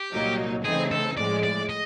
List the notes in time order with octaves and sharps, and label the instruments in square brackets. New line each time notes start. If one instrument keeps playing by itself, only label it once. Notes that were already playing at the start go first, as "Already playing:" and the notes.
Already playing: [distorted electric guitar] G4
[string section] C2 A#2 F#3 A#3 D#4
[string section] C#3 E3 A3 C4 D#4 [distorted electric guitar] G#4
[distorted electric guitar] A4
[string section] A2 F3 G#3 [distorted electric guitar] D5
[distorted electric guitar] D5
D#5